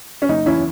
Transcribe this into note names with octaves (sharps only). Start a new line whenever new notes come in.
C#4
F#1 D#4
E2 C#4 E4